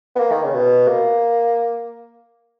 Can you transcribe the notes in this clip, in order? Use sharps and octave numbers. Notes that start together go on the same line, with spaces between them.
B3
A#3
D#3
C#3
B2
A#3